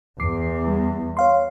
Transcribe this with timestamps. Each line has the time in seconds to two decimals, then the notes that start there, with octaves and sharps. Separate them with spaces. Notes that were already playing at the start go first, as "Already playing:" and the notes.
0.20 E2 D6 C7
0.68 G3
1.17 C#5 F5 C6